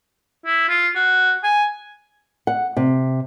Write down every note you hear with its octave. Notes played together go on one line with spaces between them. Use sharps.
E4
F4
F#4
G#5
F#5
C3